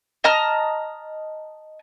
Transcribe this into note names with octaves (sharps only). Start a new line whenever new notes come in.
D#5 A5 A#5 F6